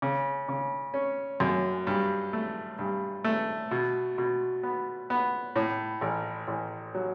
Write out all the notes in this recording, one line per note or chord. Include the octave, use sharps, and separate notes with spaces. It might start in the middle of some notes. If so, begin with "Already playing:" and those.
C#3
C#3
C#4
F#2
G2
A3
G2
A3
B2
B2
B3
B3
A2
A1
A1
F#3